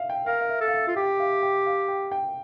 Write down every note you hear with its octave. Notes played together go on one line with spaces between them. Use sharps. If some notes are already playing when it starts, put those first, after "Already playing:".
Already playing: E5 F5
G5
A#4 F5
F5
E5
A4
F5
E5
F4
G4 G5
F5
G5
F5
G5
G5